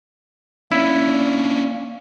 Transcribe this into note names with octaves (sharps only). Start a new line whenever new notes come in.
A#3 C#4 D4 E4